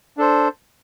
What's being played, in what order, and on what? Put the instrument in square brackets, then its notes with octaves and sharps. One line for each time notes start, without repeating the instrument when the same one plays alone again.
[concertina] D4 A4 C5